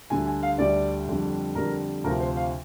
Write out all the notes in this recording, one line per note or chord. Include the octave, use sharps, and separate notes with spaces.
D2 D3 G3 G#5
G#5
F5
D2 D3 G3 D5
F2 D3 G3
F2 D3 G3 A#4
D2 C3 F3 A#4
C5
F5